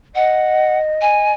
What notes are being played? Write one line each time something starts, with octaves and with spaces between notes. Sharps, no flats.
D#5 F#5
G#5